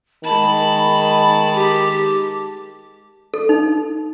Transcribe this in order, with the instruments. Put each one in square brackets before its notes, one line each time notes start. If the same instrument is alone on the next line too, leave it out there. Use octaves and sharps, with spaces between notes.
[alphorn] D#3 [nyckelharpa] G#3 A5 [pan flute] B5
[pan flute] G4
[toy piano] A4
D#4